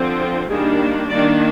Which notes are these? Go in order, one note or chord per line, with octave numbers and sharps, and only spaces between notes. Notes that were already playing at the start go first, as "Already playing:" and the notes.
Already playing: D3 F3 C4
F4
D#3 G3 A#3 D4 G#4
D#3 A#3 D4 D5